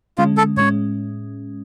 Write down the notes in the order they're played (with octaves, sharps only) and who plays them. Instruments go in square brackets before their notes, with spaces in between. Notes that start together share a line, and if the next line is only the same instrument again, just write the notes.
[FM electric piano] D3 G#3 C#4 [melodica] F4
[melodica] A4
[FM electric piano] A2 G#3 C#4 [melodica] C#5